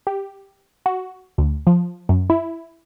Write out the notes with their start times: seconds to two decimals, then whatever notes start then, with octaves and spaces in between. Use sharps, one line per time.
0.07 G4
0.86 F#4
1.38 D2
1.67 F3
2.09 F#2
2.30 E4